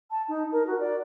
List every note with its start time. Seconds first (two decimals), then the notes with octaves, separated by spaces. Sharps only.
0.11 A5
0.29 D#4
0.52 A#4
0.67 F#4
0.80 D5